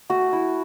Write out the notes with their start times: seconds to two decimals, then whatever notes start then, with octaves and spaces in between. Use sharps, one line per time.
0.10 A3 F#4
0.33 E4